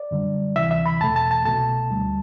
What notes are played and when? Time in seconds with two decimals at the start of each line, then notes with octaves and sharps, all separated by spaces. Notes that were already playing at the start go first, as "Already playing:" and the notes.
Already playing: D5
0.11 F#2 D3 G3
0.56 D2 C3 E3 E5
0.71 E5
0.86 B5
1.01 E2 B2 A3 A5
1.16 A5
1.31 A5
1.45 C2 B2 A3 A5
1.90 D2 D3 G3